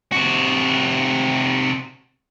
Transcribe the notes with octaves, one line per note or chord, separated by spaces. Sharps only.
C3 F#4